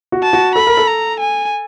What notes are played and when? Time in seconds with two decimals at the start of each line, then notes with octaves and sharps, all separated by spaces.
0.12 F#4
0.22 A5
0.33 F#4
0.55 A4 B5
0.67 A#4
0.77 A4
0.87 A#5
1.20 G#5